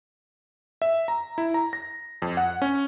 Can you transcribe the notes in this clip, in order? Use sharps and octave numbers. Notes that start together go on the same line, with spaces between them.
E5
A#5
E4
A#5
A#6
F2
F#5
C#4